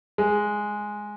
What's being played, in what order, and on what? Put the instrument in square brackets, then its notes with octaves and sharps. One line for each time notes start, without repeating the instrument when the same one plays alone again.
[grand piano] G#3